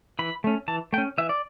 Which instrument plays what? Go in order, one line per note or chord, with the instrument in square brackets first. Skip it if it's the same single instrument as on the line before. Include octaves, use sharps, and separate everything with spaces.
[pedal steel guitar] E3 B5
A3 C#4
E3 A5
A3 G5
C#4
E3 E5
D5